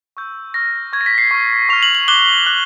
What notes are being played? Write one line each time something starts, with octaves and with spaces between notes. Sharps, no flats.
C#6 E6 G6
C#6 F6 A#6
C#6 F6 G#6
A#6
B6
C7
C#6 F6
C#6 F6 F7
F#7
F#7
D6 F#6 G7
D6 F#6